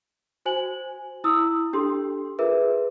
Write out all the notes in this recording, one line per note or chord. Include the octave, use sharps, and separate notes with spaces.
F#4 C5 G#5 F#7
E4 D#6 E6
D4 G4 A4 C6
F4 G#4 A#4 B4 E5